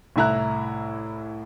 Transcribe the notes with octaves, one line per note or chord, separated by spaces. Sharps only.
C2 A2 E4 A#5 F#6